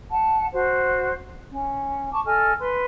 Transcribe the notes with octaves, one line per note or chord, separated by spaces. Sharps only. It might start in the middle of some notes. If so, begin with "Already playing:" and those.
F#5 A5
F#4 C5
C#4
A5 C#6 D6
A4 D#5 G#5 F6
B4 C6